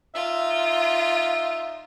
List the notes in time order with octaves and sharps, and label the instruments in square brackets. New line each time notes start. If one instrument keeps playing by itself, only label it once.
[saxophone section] D#4 E5 [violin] F4